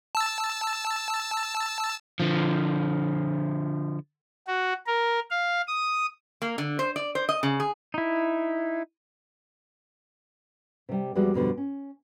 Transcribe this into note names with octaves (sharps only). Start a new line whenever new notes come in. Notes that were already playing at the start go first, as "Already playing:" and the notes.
A5 E6
D3 F3
F#4
A#4
F5
D#6
A#3
D3
C5
D5
C5
D#5
C#3
G#4
D#4 E4
C3 G3
E2 F3 G3 G#3 F#4 D5
F2 B2 D3 G3
C#4